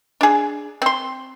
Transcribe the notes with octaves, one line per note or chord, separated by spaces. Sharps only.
D4 G#4
C4 C6